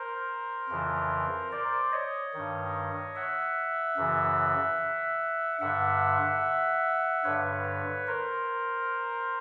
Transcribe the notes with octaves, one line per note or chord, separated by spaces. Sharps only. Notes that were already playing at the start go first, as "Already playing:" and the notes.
Already playing: A#4 C5
F2 C#3 E3
C5 D5
C#5 D#5
G2 D#3
E5 F#5
F#2 C#3 E3
G2 D3 E5 F#5
G2 D3 B4 C#5
A#4 C5